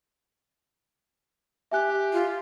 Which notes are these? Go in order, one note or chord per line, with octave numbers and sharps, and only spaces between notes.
G4 E5 G#5 F#6
F4